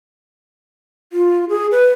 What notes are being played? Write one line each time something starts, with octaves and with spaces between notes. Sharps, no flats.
F4
G#4
B4